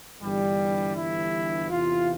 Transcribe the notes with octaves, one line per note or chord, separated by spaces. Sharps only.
G1 G2 E3 G3
E4
E2 C3 E3 F4